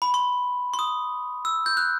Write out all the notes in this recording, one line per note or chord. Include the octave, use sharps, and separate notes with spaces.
B5
C6
C6
D#6
E6
G6
F#6